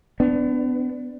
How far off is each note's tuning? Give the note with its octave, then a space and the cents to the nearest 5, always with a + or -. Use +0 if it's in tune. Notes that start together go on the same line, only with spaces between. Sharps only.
B3 +30 D4 +0